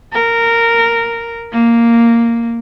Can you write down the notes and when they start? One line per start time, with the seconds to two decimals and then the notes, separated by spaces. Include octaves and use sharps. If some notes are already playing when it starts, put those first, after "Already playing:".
0.13 A#4
1.52 A#3